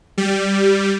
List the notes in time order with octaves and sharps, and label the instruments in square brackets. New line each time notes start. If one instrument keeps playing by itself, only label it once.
[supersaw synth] G3